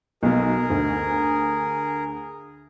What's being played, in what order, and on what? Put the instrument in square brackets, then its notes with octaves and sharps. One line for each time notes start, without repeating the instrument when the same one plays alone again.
[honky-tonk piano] B1 B2 [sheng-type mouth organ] G#4 A#4
[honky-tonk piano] D2